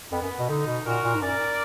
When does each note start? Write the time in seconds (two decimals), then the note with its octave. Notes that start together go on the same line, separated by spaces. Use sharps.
0.12 F2 B3
0.22 F#2
0.39 B2
0.49 D3 D#4
0.66 B2
0.85 A#2 F#4 A#4
1.04 A#2
1.15 G#2
1.21 F#2 A#4 D5